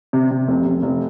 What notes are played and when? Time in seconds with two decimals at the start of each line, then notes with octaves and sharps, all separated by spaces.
0.13 C3
0.31 C3
0.48 F1
0.66 F1
0.83 F1